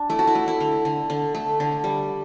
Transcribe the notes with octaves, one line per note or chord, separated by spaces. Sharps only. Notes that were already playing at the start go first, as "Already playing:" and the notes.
Already playing: D4
A3 E4
F#4
E4
A3
E4
D3
D3
D3
A3
D3
G3